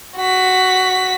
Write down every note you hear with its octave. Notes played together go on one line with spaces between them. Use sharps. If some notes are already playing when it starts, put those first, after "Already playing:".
F#4 B6